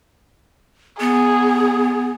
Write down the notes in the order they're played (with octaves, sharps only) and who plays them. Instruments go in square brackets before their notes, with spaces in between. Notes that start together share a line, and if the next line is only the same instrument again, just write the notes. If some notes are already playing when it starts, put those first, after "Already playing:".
[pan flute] B3 [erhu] G#4